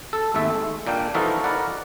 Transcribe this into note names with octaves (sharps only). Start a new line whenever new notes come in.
A4
G#1 D#2 A3 E5
G#3
A#2 A#3 D4 G5
E3 F3 D#4 F#4 A4 A#4
A#4 B4 D5 F#5